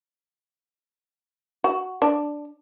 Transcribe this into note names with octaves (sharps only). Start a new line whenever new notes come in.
F#4
D4